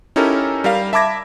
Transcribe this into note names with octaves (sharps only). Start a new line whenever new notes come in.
C#4 D#4 E4 G4 A4 A#4
G3 A#4 F5
E5 A5 B5 D6 G#6 A#6